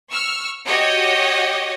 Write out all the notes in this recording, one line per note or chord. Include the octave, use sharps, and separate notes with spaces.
C#6 E6 F6
F#4 G4 C#5 D#5